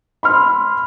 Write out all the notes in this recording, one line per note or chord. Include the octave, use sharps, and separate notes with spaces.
B5 C6 F6